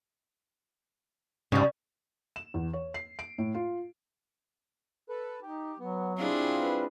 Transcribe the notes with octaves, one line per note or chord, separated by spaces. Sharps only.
G#2 C#3 G3
E7
E2
C#5
C7
D7
A2
F4
A4 B4
D#4 G4
F#3 B3
G3 C4 D4 E4 F4 G#4
B4